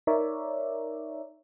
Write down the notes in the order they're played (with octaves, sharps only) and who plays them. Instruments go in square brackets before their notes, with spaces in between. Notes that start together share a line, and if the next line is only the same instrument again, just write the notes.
[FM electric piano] D#4 A#4 C#5 D5 E5